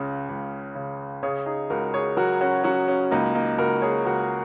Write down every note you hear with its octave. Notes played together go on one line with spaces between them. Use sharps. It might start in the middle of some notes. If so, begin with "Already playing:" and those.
Already playing: C#2 C#3 C#4
C#2
C#3
C#3 G#4 C#5
D#4 G#4
C#2 F#4 A#4
G#4 C#5
F#3 F#4 A#4
C#4 F#4
F#3 C#4 F#4
C#4
C#2 A#3 D#4
A#3 D#4
C#2 F#4 A#4
G#4 C#5
C#2 F#4 A#4